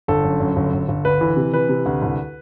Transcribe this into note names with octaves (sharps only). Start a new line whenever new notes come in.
G1 A4
F#2
F#2
G1
G1
G1
D2 B4
E3
C3
E3 B4
C3
D2
C2